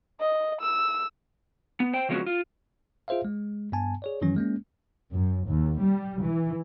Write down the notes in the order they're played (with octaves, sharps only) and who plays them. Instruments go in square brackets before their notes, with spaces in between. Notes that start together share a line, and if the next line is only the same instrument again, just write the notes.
[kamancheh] D#5
E6
[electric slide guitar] B3
C5 G5
C#3 F3 G#3 B3 C#4 F#4
F4
[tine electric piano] F4 G#4 C5 E5 F5
G#3
G2 B3 G#5 A5
G#4 C#5 D5
F#2 D#3 E3 F#3 C#4
G#3 A#3 C#4
[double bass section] F#2
D#2
G3
E3